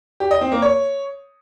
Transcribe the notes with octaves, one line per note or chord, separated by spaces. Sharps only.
G4
D#5
C4
A#3
C#5